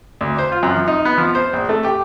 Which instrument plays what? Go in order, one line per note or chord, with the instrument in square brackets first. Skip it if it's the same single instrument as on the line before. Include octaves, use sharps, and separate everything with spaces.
[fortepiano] D2
C5
F4
F#2
F3
D#4
B3
F3
C5
A#1
A3
G4